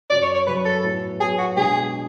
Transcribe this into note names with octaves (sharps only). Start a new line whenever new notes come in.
F#2 C#3 F#3 C#4 D5
C#5
C#5
F#2 C#3 F#3 C#4 B4
A4
A2 F#3 B3
A2 F#3 B3 G#4
F#4
B2 G#3 D4 G#4
D4